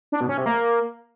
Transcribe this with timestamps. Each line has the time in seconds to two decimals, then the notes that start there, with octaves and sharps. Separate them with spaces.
0.12 D4
0.21 B2
0.29 C#4
0.37 C3
0.46 A#3